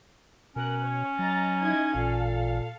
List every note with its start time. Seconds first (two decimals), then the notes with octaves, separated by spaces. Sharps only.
0.56 B2 C#4 A#4 F#6
0.85 C#5
1.19 F#3 D#5 A#5 A6
1.61 D#4 E4 D#5 G#6
1.95 A1 A#2 A4 F5